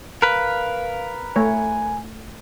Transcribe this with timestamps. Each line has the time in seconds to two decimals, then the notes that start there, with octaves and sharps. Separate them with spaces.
0.22 A#4 B4 F5
1.36 A3 C#5 G#5